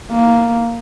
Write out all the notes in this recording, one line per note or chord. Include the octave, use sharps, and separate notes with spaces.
A#3